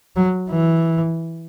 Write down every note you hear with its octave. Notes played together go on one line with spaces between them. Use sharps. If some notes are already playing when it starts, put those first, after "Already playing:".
F#3
E3